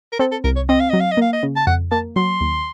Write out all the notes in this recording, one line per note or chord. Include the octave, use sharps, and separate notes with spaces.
A#4
C4 A4
A4
C2 A#4
C#5
C4 D#5
F5
F#3 D#5
F5
D#5
A#3 F5
D#5
C#3
A5
F2 F#5
A#3 A5
F#3 C6
D#2